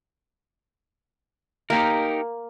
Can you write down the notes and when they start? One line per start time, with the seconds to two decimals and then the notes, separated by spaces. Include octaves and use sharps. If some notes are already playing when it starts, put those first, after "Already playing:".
1.70 A#3 D#4 G4 A#4